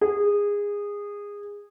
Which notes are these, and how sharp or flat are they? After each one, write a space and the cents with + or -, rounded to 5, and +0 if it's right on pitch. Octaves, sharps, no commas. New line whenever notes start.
G#4 -20